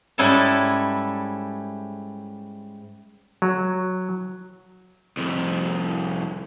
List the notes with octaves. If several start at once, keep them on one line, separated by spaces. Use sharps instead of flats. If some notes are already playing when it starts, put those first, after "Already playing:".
G#2 G3 C#4 E4 A4 A5
F#3
C2 F2